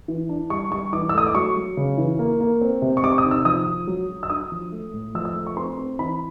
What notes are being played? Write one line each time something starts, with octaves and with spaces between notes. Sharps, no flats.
E3
D4
G3 C#6
G3 C#6
E3 D6
E6
A3 D#6
D6
F#3 C#6
F#3
C#3
E3
A#3
A#3
C4
C3
C#6
C3 D6
D#6
D#3
E6
F3 D#6
F3
F#3
F#3
E6
D4 D#6
F3
A3
A2
F3 E6
E6
A3
C#6
C4 C6
C4
E3 B5